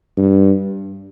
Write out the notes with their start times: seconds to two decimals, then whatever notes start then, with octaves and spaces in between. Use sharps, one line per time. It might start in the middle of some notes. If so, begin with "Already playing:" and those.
0.18 G2